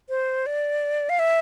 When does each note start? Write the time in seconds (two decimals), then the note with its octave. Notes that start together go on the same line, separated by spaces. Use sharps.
0.09 C5
0.46 D5
1.09 F5
1.19 E5